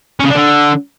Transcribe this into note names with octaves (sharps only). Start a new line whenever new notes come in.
C#4
C#3
D4
D3